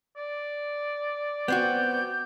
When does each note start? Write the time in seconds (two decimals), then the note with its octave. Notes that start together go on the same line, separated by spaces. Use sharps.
0.17 D5
1.48 B3 C4 F#4 G6